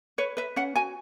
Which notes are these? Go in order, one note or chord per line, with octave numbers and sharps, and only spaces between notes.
B4 C#5
B4 E5
C#4 F#5
F#4 G#5